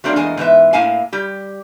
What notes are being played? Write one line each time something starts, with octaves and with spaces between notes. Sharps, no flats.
F#3 G3 A3 A#3 C4 D4
E2 G#3 A#3 D#5 G#5
G#2 E3 B3 E5
A2 A#3 E4 F5 G#5
G3 G4